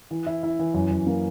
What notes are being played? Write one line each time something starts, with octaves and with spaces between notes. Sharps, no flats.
E3
E4
E4
E3
F#2
F#2
A#3